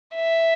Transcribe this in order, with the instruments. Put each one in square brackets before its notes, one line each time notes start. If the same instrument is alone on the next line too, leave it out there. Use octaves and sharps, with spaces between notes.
[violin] E5